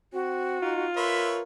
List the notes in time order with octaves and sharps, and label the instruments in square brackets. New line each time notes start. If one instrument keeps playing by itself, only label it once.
[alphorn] C4 [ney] F#4
[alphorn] D#4 [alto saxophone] F4
[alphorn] A#4 [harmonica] B4 C#5 E5 [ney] C6